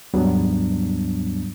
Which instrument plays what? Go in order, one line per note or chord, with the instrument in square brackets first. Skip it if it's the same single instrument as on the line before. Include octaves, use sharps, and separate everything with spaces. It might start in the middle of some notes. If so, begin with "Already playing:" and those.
[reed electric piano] D#2 G#2 F#3 G3 B3 D4